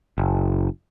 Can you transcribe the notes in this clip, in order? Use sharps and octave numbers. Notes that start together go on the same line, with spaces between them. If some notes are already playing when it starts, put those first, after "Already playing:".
F#1